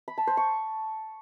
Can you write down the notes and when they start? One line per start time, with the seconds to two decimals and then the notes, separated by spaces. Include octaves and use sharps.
0.08 B5
0.18 A5
0.27 C5
0.37 C#6